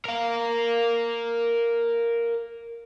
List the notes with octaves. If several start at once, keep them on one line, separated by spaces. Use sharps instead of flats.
A#4 F5